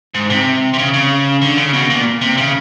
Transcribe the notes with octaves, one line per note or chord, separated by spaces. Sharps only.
G#2
C3
C3
C#3
C#3
D3
C#3
B2
A#2
C3
C#3